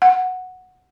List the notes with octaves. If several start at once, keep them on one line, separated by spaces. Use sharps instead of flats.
F#5